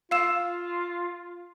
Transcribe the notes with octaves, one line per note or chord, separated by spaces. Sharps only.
F4 F5 E6 E7